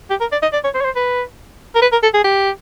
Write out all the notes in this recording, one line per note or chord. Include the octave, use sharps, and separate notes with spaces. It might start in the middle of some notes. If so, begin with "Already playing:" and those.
G4
A#4
D5
D#5
D5
C#5
C5
C#5
C5
B4
A#4
B4
A#4
A4
G#4
G4